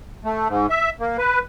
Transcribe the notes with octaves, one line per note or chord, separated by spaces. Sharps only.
A3
G#2
E5
A#3
B4